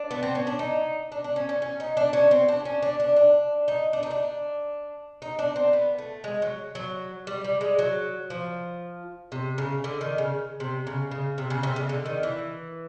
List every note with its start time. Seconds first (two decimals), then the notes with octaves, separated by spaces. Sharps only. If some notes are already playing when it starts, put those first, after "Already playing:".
Already playing: D4
0.11 B3
0.23 C4
0.35 C#4
0.47 D4
0.59 D#4
1.12 D4
1.24 D4
1.36 C#4
1.49 C#4
1.62 C#4
1.80 D#4
1.97 D4
2.13 C#4
2.31 C4
2.48 D4
2.65 C#4
2.82 D4
3.00 D4
3.16 D4
3.68 D#4
3.93 D4
4.03 D#4
4.11 D4
5.22 D#4
5.39 D4
5.56 C4
5.73 B3
5.98 A3
6.24 G#3
6.42 F#3
6.75 F#3
7.27 G3
7.44 G3
7.61 G#3
7.79 F#3
8.30 F3
9.32 C3
9.58 C#3
9.84 D3
10.01 D#3
10.18 C#3
10.60 C3
10.87 C#3
11.11 C#3
11.38 C3
11.50 C#3
11.63 C3
11.76 C#3
11.89 D3
12.06 D#3
12.23 E3